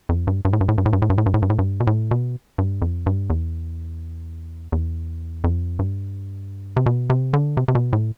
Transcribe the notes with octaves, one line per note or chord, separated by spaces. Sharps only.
F2
G2
G2
A2
G2
A2
G2
A2
G2
A2
G2
A2
G2
A2
G2
A2
G2
B2
A2
B2
G2
F2
G2
E2
E2
F2
G2
C3
B2
C3
D3
C3
C3
B2
A2